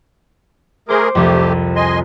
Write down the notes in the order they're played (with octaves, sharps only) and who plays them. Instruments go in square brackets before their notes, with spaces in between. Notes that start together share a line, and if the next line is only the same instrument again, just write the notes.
[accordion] A3 G#4 A#4 [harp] C5 D6
[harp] C2 F2 [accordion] A3 G4
[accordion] D#5 G#5 C6